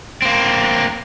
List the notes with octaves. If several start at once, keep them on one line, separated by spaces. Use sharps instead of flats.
A#3 C4